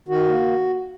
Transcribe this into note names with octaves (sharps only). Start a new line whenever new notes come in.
D#3 F#4
A#3